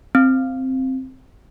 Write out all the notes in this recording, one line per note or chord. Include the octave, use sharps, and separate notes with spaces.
C4